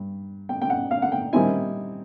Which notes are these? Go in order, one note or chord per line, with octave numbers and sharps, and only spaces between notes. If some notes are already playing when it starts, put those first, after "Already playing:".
Already playing: G2
G5
G5
F#5
F5
F#5
G5
D#3 G3 C4 E4 G#5